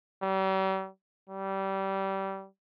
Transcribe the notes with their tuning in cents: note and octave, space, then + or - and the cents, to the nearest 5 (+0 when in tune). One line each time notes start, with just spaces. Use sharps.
G3 -40
G3 -20